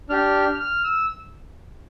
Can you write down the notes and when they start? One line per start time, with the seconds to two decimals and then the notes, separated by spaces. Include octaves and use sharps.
0.10 D4 G4 F6
0.60 F6
0.84 E6